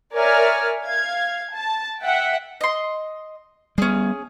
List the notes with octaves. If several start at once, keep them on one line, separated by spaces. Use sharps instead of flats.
A#4 C#5 D5 E5 G#5 F6
F5 G#6
A5
E5 F#5 G5
D#5 C6
G3 B3 C#4 G#4